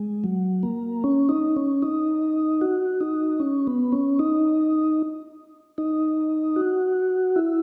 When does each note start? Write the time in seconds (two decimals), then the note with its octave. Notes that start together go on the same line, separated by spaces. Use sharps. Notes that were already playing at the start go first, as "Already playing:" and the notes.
Already playing: G#3
0.24 F#3
0.63 A#3
1.04 C#4
1.29 D#4
1.56 C#4
1.82 D#4
2.61 F#4
3.01 D#4
3.40 C#4
3.67 B3
3.92 C#4
4.19 D#4
5.78 D#4
6.56 F#4
7.36 E4